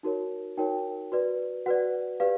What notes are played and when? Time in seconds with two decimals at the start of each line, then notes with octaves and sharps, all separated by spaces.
0.03 D#4 F#4 A#4 C#5
0.57 D#4 F#4 A#4 C#5 G5
1.12 F#4 B4 D5
1.66 F#4 B4 D5 F#5
2.20 G4 B4 D5 F5